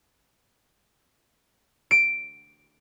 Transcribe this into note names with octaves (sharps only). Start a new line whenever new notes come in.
D7